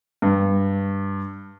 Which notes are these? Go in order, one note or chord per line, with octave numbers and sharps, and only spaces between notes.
G2